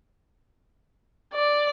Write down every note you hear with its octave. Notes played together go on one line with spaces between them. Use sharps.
D5